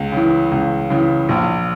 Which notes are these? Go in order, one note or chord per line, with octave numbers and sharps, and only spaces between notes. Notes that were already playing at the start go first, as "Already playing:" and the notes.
Already playing: C#2
C#3 E3
C#2
C#3 E3
A#1